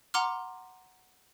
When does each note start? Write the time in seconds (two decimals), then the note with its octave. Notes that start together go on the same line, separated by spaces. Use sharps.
0.14 F#5 A#5 C6 D6 F6